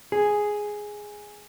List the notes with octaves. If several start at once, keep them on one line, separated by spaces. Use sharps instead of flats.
G#4